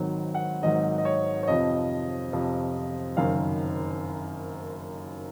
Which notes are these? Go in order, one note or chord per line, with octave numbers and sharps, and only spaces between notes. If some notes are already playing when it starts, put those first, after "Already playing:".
Already playing: G#1 G#2 D#3 F#3
F#5
G#1 G#2 D#3 F#3 D#5
D#5
C#5
C#5
F2 C3 F3 D#5
F2 C3 F3
F#1 F#2 D#3 F5